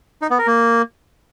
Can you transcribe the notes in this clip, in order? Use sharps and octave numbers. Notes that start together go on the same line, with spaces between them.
D#4
B3
A#4
A#3